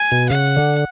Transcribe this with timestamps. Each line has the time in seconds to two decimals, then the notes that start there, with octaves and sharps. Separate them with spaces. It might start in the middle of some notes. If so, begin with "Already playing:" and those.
Already playing: G#5
0.12 B2
0.30 C#3 F#5
0.57 D3